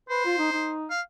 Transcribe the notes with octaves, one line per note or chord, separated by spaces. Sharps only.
B4 C5
F4
D#4
D#4
F5